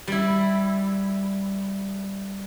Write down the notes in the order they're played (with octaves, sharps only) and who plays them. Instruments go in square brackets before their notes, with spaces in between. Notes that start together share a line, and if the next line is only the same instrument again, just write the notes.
[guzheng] G3 E4